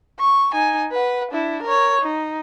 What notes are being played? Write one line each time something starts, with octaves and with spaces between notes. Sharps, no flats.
C#6
D#4 G#5
B4 F#5
D4 E4
A#4 C#5
D#4